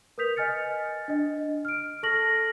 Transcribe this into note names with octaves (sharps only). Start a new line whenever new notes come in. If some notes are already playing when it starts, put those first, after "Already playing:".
A#4 B4 D#6 G6 B6 F7
D#5 G#5 F6 A6 C#7
D4 D#5
F6 D7
A4 A5 C#6 F6 A#6 F#7